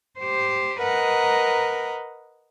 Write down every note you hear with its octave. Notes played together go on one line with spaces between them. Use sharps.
G4 C5
A#4 B4 D#5 F#5 A#5